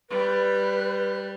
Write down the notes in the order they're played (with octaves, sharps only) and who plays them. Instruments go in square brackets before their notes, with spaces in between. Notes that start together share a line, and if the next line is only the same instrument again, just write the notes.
[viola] G3 [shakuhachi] B4